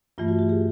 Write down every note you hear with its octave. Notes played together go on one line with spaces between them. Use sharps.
G2 E3 A3 F4
F#4
G4
G#4